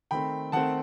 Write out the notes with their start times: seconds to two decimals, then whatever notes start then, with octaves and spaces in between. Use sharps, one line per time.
0.11 D#3 A3 C4 G5 B5
0.52 D#3 A3 C4 F#5 A5